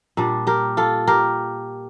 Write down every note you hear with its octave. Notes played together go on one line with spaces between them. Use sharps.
A#2 G3 D4
G4 A#4
F4 A4
G4 A#4